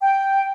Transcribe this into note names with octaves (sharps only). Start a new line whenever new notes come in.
G5